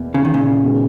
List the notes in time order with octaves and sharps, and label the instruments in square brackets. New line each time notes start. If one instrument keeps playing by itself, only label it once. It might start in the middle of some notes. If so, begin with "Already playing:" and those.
Already playing: [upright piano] E2 B2 A#3
[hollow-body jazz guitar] C#3
D#3
A#2 C#3
[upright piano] D#3 G#3 B3 F#4